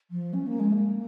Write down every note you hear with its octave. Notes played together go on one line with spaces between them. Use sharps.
F3
C#4
A#3
G#3
A#3